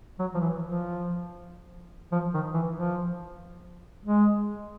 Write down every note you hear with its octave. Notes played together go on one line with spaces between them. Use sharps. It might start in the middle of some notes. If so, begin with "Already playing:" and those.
F#3
F3
E3
F3
F3
D#3
E3
F3
G#3